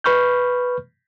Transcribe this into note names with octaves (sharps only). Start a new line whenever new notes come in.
B4 B5 C#6 F6 G6